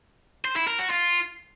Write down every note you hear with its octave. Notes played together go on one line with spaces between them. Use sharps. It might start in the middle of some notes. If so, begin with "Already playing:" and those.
C5
E4
A#4
F#4
F4